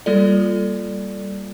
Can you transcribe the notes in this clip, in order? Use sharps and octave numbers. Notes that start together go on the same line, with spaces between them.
G3 A#3 F4 A4 D5